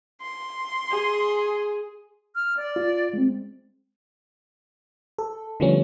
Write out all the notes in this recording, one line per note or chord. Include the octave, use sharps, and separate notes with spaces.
C6
G#4
F6
D5
F4
G#3 C4
A4
D3 F3 G3 A3 B3 C#4